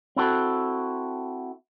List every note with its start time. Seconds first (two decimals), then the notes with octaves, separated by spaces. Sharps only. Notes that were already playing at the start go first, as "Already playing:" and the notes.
0.16 C4 E4 F#4 A4